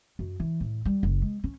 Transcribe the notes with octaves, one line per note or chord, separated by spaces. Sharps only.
F#2
E3
A2
G3
F#1
G#3
C#4